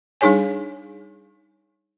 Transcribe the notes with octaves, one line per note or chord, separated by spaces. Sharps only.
G3 D4 D#4 G#4 C#5 G#5